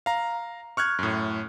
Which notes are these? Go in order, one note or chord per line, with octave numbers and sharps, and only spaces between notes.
F5 A#5
C#6 F6 F#6 G#6
F#2 A2